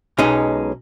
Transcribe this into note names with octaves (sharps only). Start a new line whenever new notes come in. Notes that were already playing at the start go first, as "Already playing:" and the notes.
B1 G#3 C#4 D#4